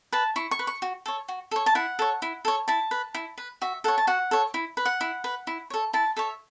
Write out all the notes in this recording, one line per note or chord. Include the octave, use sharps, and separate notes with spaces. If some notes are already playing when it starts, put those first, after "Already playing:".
B4 A5
E4 C#6
C#6
B4
C#6
F#4
A4 C#5
F#4
A4 C#5
A5
E4 F#5
A4 C#5
E4
A4 C#5
E4 A5
B4
E4
B4
F#4 E5
A4 C#5 F#5
A5
F#4 F#5
A4 C#5
E4
B4
F#5
E4
B4
E4
A4 C#5
E4 A5
A4 C#5 E5